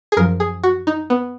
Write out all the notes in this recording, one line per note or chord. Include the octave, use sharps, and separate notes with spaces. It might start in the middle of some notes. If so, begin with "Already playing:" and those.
G#4
F#2 F3 A#4
G#4
F#4
D#4
B3